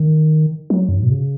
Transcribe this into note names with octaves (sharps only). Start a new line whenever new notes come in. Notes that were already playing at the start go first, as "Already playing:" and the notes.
Already playing: D#3
F#3
F#2
G#2
B2
C#3